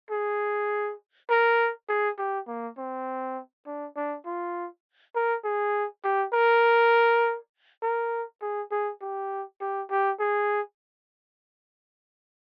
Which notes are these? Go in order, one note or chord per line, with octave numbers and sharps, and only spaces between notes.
G#4
A#4
G#4
G4
A#3
C4
D4
D4
F4
A#4
G#4
G4
A#4
A#4
G#4
G#4
G4
G4
G4
G#4